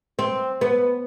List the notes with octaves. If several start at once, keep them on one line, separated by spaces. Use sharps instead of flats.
C4
B3